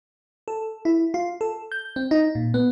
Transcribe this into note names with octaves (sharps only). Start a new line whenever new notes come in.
A4
E4
F4
A4
G6
C4
D#4
A#2
B3